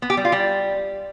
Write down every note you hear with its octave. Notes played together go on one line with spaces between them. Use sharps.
B3
G4
G3
F4
G3